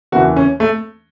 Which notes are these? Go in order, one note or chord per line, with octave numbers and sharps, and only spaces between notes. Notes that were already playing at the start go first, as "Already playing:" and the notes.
F#1 E2 E3 F#4
C#4
A3